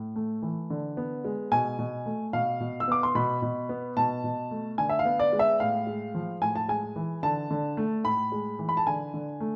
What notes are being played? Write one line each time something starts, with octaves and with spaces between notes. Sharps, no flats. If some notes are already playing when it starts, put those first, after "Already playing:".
Already playing: A2
A3
E3
D3
B3
G#3
B2 G#5
B2
A3
B2 F5
B2
E6
B3 D6
C6
B2 B5
B2
B3
B2 A5
B2
A3
D3 G#5
E5
F5
B3
D5
G#3
E5
A2 F5
G#3
F3
A2 G#5
A5
G#3 G#5
E3
D3 A5
D3
A3
A2 B5
G#3
E3
B5
A5
D3 G#5
D3
A3